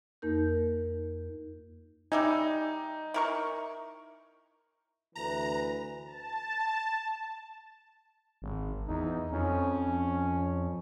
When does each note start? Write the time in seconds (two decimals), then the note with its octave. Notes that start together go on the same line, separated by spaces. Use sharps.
0.22 F2 A#3 D#4 A#4 G6
2.12 G3 D#4 E5 G#5
3.14 E4 A#4 C#6
5.15 D2 E3 B4 A#5
6.06 A5
8.42 G#1
8.88 E2 D#4
9.32 F2 C#4